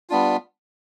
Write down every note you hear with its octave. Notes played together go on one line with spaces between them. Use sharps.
G3 B3 D4 F4